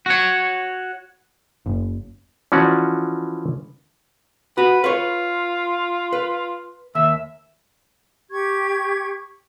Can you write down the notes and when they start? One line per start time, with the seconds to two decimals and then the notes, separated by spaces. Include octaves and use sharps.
0.06 F#4 C#5
1.66 F#1
2.52 E3 F3 C#4 F#4 D5
4.58 F#4 B4
4.84 F4 B4 C#5
6.13 B4
6.95 D#2 E5
8.31 G4 C#6 G#6